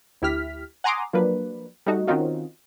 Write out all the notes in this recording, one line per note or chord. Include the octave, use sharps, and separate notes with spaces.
D2 E4 G4 F6 B6
F#5 G#5 A#5 C6 D6 D#6
F3 F#3 A#3 D4 B4
G3 A3 D#4 F#4
D#3 C4 C#4 D#4 F4 F#4